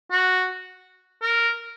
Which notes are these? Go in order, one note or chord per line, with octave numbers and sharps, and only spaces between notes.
F#4
A#4